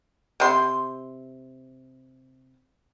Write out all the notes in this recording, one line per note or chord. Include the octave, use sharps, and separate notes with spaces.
C3 C6